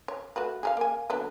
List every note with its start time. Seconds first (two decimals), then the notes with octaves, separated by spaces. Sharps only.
0.08 C#5
0.36 A3 F#4 B4
0.63 G#4 A#4 F5
0.77 A#3 G#5
1.10 D3 F#3 B3